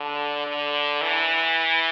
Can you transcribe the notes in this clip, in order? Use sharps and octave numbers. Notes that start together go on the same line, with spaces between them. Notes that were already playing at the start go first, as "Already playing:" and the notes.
Already playing: D3
D3
E3